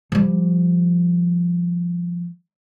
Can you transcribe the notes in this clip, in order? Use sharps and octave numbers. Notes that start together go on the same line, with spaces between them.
F3 G3